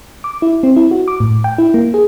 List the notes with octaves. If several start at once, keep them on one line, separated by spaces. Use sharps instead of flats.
D6
E4
C4
E4
F#4
D6
A2
G5
E4
A#3
G#4